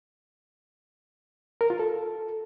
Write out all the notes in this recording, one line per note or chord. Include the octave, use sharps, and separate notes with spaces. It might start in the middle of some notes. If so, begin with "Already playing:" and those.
A#4
F4
A4